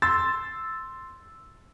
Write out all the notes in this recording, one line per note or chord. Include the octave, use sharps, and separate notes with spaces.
C6 E6 A6